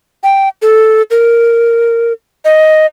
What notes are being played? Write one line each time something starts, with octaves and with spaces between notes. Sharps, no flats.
G5
A4
A#4
D#5